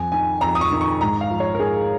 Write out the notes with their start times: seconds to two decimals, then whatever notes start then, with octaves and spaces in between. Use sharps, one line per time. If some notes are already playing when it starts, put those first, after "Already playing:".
Already playing: F2 G#5
0.12 D#3 G#5
0.41 F2 A#5
0.55 D#6
0.61 C#6
0.71 D#3
0.81 C#6
1.01 G#2 A#5
1.21 F5
1.30 F3
1.40 C#5
1.55 A#4
1.60 G#2 G#4